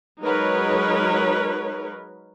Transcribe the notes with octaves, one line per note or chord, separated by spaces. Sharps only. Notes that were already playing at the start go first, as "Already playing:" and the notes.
F#3 G#3 D#4 A#4 B4 C#5